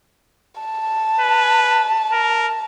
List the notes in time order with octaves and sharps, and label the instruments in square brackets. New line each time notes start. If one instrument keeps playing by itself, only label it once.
[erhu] A5
[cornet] B4
A#4